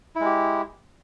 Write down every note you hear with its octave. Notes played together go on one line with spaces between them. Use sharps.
G#3 E4 G4